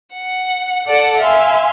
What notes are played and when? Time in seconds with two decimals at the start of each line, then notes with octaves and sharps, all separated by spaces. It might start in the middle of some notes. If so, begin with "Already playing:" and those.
0.13 F#5
0.86 A4 D5 F#5 A5
1.18 E5 F5 G#5 C6